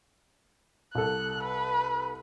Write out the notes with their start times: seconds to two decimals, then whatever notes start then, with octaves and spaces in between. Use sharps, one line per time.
0.95 C2 A4 F#6
1.43 B4